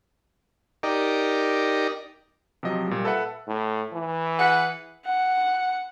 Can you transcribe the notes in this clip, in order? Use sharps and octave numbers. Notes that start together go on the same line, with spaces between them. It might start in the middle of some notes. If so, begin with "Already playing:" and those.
D#4 G4 A#4 D5
C3 F3 F#3 D#5
A#2 G3
A4 B4 E5 F#5
A2
E3
G#4 B4 F#5
F#5